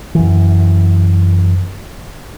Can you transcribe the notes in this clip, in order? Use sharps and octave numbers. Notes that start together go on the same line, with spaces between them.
F#2 E3